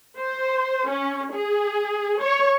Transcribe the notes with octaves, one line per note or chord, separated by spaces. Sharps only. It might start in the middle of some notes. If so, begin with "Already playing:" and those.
C5
C#4
G#4
C#5